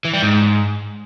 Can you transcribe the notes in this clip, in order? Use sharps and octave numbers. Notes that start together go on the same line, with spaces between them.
E3
G3
G#2